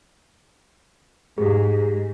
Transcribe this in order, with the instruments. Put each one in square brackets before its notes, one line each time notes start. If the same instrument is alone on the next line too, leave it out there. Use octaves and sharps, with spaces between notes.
[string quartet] G#2 [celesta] G4 G#4